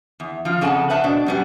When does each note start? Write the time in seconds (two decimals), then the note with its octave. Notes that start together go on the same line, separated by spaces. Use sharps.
0.20 E2
0.45 F3 F4
0.61 F2 C#3 A4 F#5 G#5 A5
0.90 B4 C5 E5 F#5 A5
1.04 B2 D4
1.26 F#2 G3 B3